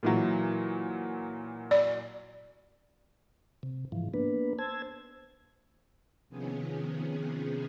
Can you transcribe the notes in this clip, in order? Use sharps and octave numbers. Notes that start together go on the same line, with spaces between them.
A#2 E3 F#3
D5
C3
G#2 E3 F3
A#3 B3 D4 B4
C5 A5 E6 G#6
C3 D#3 F3 B3 C#4 G#4